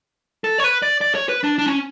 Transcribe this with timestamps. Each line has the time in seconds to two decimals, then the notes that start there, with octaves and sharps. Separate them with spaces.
0.44 A4
0.58 C#5
0.64 B4
0.82 D5
1.01 D5
1.15 C#5
1.29 B4
1.44 D4
1.59 D4
1.66 C#4